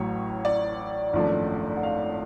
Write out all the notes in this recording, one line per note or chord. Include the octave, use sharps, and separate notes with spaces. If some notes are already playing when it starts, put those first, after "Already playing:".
Already playing: A1 A2 F#3 C#5
D5
G#1 F#2 F3 A3 D4
F#5
F5